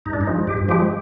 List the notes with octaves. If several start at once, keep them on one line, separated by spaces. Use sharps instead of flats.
G2 D#4
D4
D#4
F3 G#3
G2 G4
F3 G#3 G4